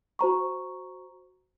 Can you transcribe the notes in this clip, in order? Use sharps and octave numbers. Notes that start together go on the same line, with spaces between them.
F#4 C5 A#5 C#6